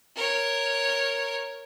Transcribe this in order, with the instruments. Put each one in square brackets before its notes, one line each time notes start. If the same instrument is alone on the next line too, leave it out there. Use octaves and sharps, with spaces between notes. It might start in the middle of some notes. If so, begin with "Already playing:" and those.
[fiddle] A#4 C#5